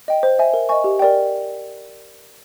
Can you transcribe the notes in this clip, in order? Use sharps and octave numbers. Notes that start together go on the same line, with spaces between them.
D#5 G5
C5
E5 G#5
A#4
D#5 G#5 C#6
G4
A#4 D5 G5